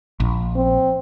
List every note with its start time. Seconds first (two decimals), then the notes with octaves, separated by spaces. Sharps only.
0.20 A#1
0.56 C4